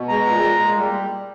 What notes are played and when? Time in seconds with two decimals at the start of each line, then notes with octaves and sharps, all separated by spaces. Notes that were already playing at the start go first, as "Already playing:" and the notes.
Already playing: B2
0.09 G#3 A#5
0.26 A#2
0.42 G#3
0.59 A#2
0.76 G3